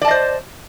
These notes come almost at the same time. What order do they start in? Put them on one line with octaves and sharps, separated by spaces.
D5 A5 D#5 C5